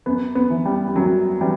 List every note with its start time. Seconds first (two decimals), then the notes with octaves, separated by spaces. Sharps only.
0.06 F#2 B3
0.35 B3
0.50 E3
0.65 G3
0.88 G3
0.96 F#2 F#3
1.40 E3 G3